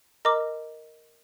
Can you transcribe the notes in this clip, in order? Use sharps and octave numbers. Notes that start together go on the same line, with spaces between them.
A#4 D#5 A#5 D6